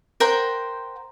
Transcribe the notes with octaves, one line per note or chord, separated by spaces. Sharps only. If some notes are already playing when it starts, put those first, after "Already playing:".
A#4 C5 F#5 G5